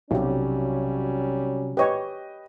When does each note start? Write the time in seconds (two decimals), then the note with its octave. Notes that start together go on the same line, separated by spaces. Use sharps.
0.11 B1 C3 F#3 G3 C#4 F#4 G4
1.77 G4 B4 C#5 D#5 G5